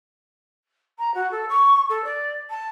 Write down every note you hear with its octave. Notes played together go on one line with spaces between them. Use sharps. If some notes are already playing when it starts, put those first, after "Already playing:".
A#5
F#4
A4
C#6
A4
D5
A5